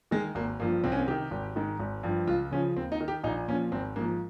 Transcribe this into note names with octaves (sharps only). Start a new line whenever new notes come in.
D#3 G#3
G#1 A#3
G2 F3 A#3
C2 C4
C#4
C4
C3 D#3 G4
G#1
G#2 D#3
G#1
G2 F3
C#2 F4
C#3 F3 C#4
D#2 C4
D#4
D#3
G4
A#1 D#4
A#2 F3 C#4
G#1 C4
G#2 F3 A#3